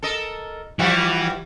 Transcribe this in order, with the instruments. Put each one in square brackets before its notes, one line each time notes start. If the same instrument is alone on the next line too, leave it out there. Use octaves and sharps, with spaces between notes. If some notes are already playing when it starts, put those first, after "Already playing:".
[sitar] A4 A#4 D#5
[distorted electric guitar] E3 E4 [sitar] F3 G3 F#4